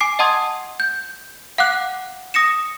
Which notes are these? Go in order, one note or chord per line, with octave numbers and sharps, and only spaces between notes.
G#5 D6 C7
D#5 F#5 A5 C6 D#6 G#6
G6
F5 F#5 D6 F#6
D#6 A#6 C#7 E7